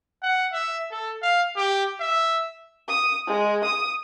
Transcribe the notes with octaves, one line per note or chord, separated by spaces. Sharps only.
F#5
E5
A4
F5
G4
E5
D#6
G#3
D#6